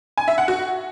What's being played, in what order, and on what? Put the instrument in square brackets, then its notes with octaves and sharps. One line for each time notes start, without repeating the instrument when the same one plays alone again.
[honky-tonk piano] G#5
E5
F#5
F#4